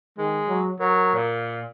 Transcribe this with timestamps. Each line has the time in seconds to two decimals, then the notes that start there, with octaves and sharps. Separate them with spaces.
0.18 D#3 G#3
0.48 F#3
0.80 F#3 A#4
1.15 A#2